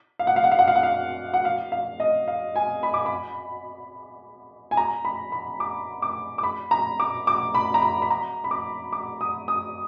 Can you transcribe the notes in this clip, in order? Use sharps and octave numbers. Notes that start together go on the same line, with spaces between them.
F5
F#5
F5
F#5
F5
F#5
F5
F#5
F5
F#5
F5
F5
D#5
F5
G#5
B5
D6
B5
G#5
A#5
B5
B5
D6
D6
D6
B5
A#5
D6
D6
B5
A#5
B5
B5
A#5
B5
D6
D6
D#6
D#6